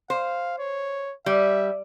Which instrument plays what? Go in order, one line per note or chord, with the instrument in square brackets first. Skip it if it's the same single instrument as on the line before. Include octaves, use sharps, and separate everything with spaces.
[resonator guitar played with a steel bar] C5 [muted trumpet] F5
[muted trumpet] C#5
[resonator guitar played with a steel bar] G3 [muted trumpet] E5